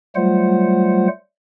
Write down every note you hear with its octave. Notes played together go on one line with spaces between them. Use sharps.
F#3 G3 A3 F4 C5 F#5